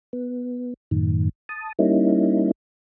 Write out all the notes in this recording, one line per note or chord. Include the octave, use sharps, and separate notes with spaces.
B3
F#2 A2 D#3
A5 D#6
G3 A#3 C#4 D#4 E4